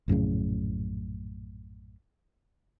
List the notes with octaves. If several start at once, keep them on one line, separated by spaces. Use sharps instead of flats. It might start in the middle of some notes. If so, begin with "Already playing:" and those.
A#1 F#2 A2 C#3